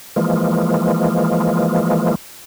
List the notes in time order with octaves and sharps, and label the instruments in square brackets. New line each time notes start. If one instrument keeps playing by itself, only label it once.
[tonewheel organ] E3 F3 G#3 A#3